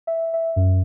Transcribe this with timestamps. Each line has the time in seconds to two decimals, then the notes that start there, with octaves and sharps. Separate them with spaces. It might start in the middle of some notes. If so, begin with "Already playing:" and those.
0.07 E5
0.34 E5
0.56 F#2